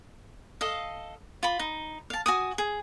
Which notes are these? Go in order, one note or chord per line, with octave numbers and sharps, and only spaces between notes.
A4 D#5 F5
F4 B5
D#4
F5 A5
F#4 G#5 D#6
G#4